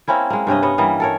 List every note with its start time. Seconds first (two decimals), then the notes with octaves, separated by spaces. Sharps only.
0.08 A#3 C4 C#4 E4
0.30 G#3 A#3
0.47 G2 C3 C#4 D#5
0.62 B3 C#5 D#5
0.78 E3 G3 A#3 D#5
1.00 A4 A#4 C#5